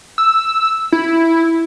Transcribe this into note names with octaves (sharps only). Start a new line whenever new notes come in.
E6
E4